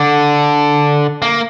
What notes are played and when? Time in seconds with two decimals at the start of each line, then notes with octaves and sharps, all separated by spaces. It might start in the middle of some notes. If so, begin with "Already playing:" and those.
Already playing: D3
1.22 A#3